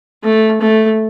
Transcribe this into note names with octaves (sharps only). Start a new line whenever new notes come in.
A3
A3